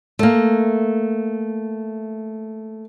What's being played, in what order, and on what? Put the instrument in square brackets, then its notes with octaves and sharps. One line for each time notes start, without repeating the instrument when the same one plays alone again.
[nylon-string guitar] A3 A#3